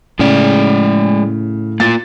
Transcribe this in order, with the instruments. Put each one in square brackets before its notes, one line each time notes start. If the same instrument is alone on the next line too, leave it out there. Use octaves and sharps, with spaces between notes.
[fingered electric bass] A2 [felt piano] C#3 [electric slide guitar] G#3 G#4 D5
[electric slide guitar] A#3 F4 [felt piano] A6